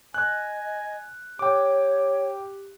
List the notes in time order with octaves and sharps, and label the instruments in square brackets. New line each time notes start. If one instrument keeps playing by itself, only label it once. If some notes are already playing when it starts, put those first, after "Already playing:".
[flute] D#5 [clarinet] G#5 [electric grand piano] F#6
[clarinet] G4 [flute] C#5 [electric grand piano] G5 D6